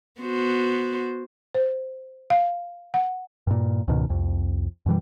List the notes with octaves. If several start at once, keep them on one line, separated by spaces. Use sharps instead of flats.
B3 F#4 C5
C5
F5
F#5
G2 A#2
C#2 G#2 B2 D#3
C2 F2
F#2 B2 E3 G3